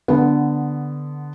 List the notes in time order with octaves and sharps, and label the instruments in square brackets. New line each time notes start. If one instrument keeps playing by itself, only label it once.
[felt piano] D3 B3